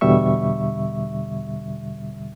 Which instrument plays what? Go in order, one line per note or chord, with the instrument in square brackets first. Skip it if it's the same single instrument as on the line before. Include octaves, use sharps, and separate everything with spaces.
[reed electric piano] E2 B2 D3 G3 E5 C#6